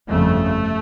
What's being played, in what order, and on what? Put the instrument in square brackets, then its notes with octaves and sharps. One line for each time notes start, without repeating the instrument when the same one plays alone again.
[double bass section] G1 F2 C#3 A3